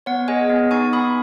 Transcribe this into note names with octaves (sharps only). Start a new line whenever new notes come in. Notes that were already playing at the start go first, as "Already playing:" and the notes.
B3 C#5 F#5
G#4 D#5 G#5
B3
D#4 G#5 C#6
B3 B5 D#6